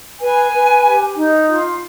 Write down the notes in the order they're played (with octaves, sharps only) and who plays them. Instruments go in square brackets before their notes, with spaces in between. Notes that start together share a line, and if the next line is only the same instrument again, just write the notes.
[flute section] B4 G#5
B4
G4
D#4
F4